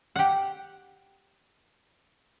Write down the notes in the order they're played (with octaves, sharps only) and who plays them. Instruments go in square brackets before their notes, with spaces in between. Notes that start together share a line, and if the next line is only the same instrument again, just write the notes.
[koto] G4 F#5